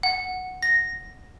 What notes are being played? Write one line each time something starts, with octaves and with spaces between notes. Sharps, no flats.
F#5
A#6